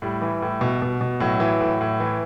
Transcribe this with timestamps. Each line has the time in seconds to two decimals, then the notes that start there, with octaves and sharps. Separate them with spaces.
0.02 A2 G3
0.22 E3
0.42 A2
0.61 B2
0.82 B2
1.01 B2
1.20 A2 F#3
1.40 E3
1.61 A2
1.81 A2
2.00 E3